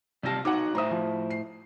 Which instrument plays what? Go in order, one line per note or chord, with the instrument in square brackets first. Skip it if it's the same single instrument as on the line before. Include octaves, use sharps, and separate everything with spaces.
[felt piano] C3 A#6 [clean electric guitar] G3 F4 A5
[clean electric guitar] D#4 F#4 C#5 [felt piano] F#5 D6
[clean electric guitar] A2 C5 E5 [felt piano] A#5 D#6
[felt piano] F3
C7